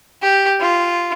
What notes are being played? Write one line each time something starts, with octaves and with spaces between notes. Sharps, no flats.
G4
F4